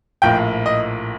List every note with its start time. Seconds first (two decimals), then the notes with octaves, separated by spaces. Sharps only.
0.22 A#1 A2 F3 A#3 G5
0.66 D#5